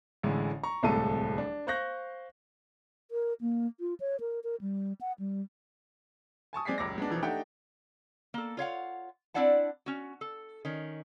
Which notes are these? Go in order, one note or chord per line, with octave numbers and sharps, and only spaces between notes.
A1 A2 D3 G#3
A#5 C#6
D1 C2 G#3 A3 A4 D#7
D4
C5 F5 C#6 F#6 G6 A#6
A#4
A#3
F4
C#5
A#4
A#4
G3
F#5
G3
G#5 A5 C#6 D#6
G#3 C4 D5 G#5 B6 C7
D#1 C#2 F#2 D6 A#6
G#3 B3 D4
E1 E3 F3
A3 D4 D#4 G4 F#5 G5
A#3 A4
F4 C#5 F5 F#5
C4 D4 E4 D5 F#5 A5
C#4 F#4
A4
D#3 C#4